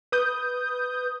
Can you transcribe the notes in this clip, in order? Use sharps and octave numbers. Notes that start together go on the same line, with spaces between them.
B4 D#6 G6